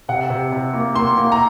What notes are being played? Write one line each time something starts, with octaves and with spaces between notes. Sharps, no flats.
C3 F#5
C3
C3
A#3
A#3 C6
A#3
A#5